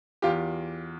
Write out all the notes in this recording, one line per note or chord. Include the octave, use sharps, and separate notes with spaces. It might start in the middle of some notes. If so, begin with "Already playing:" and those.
E2 F4 G4